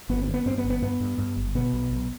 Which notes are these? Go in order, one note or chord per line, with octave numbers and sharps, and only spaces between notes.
G1 B3
C4
G2
B3
G2 C4
B3
G1
B3
G2 B3
G2
G2
G1
B2 B3
B1
B1